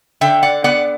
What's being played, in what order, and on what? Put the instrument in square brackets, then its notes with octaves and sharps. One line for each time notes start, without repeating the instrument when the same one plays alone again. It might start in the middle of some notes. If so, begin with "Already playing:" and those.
[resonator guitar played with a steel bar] D3 E5 G5
D5 F#5
B3 D5 F#5